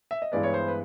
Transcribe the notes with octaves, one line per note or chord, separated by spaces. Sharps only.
E5
D#5
G2 E3 G#3 B3 D5
C#5
C5
B4